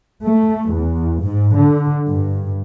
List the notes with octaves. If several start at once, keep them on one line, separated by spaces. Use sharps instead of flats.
A3
E2
G#2
D3
G2